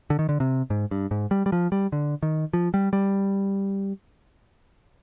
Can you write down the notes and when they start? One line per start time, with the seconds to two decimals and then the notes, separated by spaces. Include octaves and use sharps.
0.10 D3
0.19 D#3
0.29 D3
0.40 C3
0.70 G#2
0.91 G2
1.11 G#2
1.31 G3
1.46 G3
1.52 F3
1.72 G3
1.92 D3
2.23 D#3
2.53 F3
2.74 G3
2.93 G3